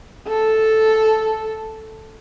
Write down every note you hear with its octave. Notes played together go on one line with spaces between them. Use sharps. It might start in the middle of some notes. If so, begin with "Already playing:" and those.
A4